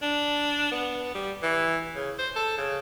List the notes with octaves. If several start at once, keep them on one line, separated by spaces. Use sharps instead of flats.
D4
B3
G3
E3
C#3
C5
A4
C#3